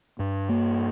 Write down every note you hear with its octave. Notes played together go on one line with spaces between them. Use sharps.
G2
A#3